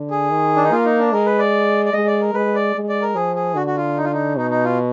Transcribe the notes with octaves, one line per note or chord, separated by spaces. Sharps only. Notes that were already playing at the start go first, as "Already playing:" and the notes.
Already playing: D3
G#4
D#3
D4
D#4
A#3 F4
D#4
D4
G#3 A#4
B4
D5
D5
G#3 D#5
D5
A#4
G#3 B4
D5
G#3
D5
A#4
F3 G#4
G#4
D3 F#4
F#4
F4
D#4
F4
D#4
B2 D#4
D#4
F4